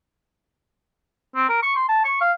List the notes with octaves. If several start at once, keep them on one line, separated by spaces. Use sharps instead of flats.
C4
A#4
C#6
C6
A5
C#6
F5